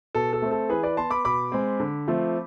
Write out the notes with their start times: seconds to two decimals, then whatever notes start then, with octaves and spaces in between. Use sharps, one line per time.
0.15 B2 A4
0.33 A4
0.42 A3 C4
0.51 A4
0.69 E3 G#4 B4
0.83 B4 D5
0.97 B3 A5 C6
1.11 B5 D6
1.25 B2 B5 D6
1.52 G#3 C4
1.80 D3
2.08 F3 A3 C4